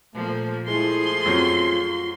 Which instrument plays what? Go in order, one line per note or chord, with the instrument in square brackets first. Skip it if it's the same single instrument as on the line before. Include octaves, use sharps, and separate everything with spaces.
[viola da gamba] A#2 F3 A#3 [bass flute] A3
[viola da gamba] F3 A3 G#4 [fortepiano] G#3 [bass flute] E4 [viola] C6
[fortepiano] F#2 F#3 C4 [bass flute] F4